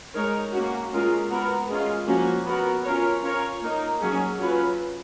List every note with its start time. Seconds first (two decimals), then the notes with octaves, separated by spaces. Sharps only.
0.14 G#3 D#4 A#4 C#5
0.53 A#3 C#4 F#4
0.92 G#3 C#4 F4 A#4
1.30 B3 F#4 A#4
1.69 G#3 C#4 F4
2.07 F3 A#3 C#4 F#4
2.46 B3 F#4 A#4
2.84 C#4 F4 A#4 C#5
3.23 C#4 F4 A#4 C#5
3.62 A#3 D#4 A#4
4.00 F#3 A#3 C#4 G#4
4.39 F#3 C#4 F4 B4